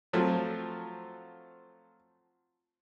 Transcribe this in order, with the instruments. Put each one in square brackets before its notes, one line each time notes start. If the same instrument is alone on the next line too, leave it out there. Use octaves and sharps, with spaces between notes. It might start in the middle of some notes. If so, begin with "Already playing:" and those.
[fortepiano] F3 F#3 A3 C4 F4